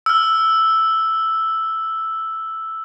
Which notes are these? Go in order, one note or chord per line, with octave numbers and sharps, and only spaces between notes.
E6 F6